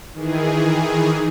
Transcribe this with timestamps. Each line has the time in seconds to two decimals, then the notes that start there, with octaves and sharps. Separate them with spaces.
0.13 D#3 E3 G#4